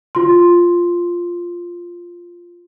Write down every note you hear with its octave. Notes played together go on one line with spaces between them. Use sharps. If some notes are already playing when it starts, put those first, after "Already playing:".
F4 C6